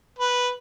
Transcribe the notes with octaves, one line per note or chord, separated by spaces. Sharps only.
B4